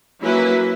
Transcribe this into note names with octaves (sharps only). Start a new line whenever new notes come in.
F#3 A#3 C#4 E4 B4